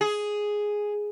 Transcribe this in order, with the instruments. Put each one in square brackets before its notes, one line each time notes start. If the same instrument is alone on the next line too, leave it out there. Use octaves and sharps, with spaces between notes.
[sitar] G#4